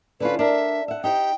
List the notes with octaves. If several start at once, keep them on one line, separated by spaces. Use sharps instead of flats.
D3 C#4 F4 B4
D4 A#4 E5
E5 F#5
D#4 G4 C5 G5